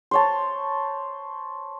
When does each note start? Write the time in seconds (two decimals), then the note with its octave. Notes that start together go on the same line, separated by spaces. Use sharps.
0.11 C5 C#5 A5